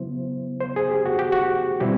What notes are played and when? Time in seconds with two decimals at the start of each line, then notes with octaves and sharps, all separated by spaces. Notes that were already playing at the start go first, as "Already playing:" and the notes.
Already playing: C#3 F#3 B3 E4 C5
0.61 C5
0.76 G#4
0.90 G4
1.06 F#4
1.19 G4
1.32 F#4
1.80 B2 G3 C4 E4 G4